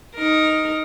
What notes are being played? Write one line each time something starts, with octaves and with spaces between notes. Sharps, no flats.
D#4 A#4